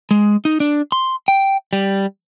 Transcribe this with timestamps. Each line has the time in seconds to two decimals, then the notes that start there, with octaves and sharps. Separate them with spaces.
0.11 G#3
0.45 D#4
0.60 D4
0.92 C6
1.28 G5
1.73 G3